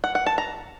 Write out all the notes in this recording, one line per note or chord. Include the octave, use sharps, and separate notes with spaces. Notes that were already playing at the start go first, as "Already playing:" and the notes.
F#5
F#5
A5
A#5